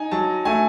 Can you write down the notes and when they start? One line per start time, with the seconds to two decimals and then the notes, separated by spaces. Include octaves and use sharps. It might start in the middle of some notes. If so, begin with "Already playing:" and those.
Already playing: D#4 G#5
0.11 F#3 A5
0.45 A3 G#5